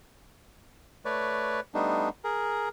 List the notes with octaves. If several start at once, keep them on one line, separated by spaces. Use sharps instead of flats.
A3 B4 C#5 D5
G3 A3 B3 D4 D#4
G#4 A#4